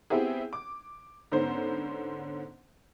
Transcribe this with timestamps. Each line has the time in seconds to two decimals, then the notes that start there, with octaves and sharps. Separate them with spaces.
0.10 B3 C4 E4 G4 G#4
0.53 D6
1.32 G#2 D3 B3 C#4 C5